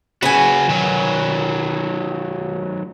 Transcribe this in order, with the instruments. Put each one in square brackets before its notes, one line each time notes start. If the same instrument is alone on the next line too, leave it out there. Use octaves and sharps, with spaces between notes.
[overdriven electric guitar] C#3 F#4 [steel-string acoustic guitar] B4 G#5
[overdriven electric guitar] D#3 F#3